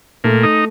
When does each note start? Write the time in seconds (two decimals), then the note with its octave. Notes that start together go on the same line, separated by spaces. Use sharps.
0.24 A#2 A3
0.43 D#4